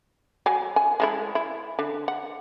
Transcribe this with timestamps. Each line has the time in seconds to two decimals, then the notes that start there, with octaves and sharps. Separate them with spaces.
0.46 F#3 G#5
0.76 G#5
1.00 G#3 A3 E4
1.35 E4
1.79 D3
2.08 F#5